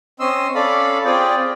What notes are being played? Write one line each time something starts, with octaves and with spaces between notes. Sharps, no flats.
C4 C#4 D#5 C6 E6
C#4 A4 D5 F5 B5
C4 F4 G#4 D5 G5